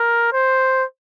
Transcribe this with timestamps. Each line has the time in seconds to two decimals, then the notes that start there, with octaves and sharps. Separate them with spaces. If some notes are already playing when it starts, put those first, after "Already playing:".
Already playing: A#4
0.33 C5